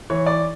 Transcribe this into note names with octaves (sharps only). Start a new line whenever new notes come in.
E3 C#5
D5